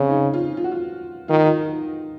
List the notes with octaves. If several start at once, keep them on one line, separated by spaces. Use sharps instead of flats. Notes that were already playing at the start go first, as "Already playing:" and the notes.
Already playing: C#3 C4 C#4
D#4
F4
F4
F#4
F4
D#3 F4
D#4
F4